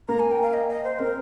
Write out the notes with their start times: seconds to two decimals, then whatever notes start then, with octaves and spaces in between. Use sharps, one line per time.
0.08 A#3 A#5
0.20 G#5
0.31 G5
0.42 F5
0.53 D#5
0.69 D#5
0.84 C5
0.99 C4 A#4